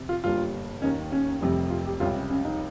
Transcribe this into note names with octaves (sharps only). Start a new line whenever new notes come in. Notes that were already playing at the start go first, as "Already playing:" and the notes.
Already playing: F2 C3
F4
G1 G2 G3 A#3 F4
D#2 D#3 A#3 C#4 D#4
C#4
F1 F2 C3 G3
F4
G4
C#2 C3 G3 F4
C#4
C#4
D#4